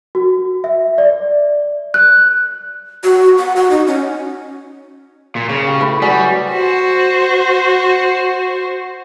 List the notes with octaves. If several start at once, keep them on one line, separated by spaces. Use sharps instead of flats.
F#4
E5
D5
F#6
F#4
F#5
F#4
D#4
C#4
A#2
C#3 C#6
G4
A2 B4 C#6
F#3 G3 G#4 D5
F#4 C5